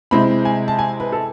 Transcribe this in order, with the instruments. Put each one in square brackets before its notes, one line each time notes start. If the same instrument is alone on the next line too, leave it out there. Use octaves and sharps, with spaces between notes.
[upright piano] C3 G#3 C4 E4 B5
G#5
A5
G#5
B4
A4